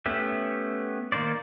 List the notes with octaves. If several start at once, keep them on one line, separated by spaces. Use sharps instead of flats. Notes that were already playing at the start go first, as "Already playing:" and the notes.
A3 B3 C#4 G4 E5
D#3 A#3 D#4 C5 D5